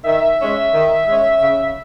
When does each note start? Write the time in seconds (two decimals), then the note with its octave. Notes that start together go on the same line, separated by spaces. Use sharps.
0.05 D#3 E5
0.39 G#3 C#4
0.73 D#3
1.06 G#3 C#4
1.41 C#3